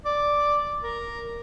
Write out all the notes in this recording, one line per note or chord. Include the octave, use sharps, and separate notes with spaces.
D5
A#4